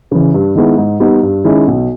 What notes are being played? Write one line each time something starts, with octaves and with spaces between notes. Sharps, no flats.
C#3 E3
G2
D#3 G#3 B3 E4
G#2
G3 B3 D#4
G2
D#3 G#3 C#4 E4
B1